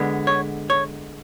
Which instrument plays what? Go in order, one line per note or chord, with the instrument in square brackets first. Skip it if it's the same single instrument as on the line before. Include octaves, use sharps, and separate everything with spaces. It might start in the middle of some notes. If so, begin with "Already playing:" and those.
Already playing: [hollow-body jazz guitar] D3 G#3 B3
C#5
C#5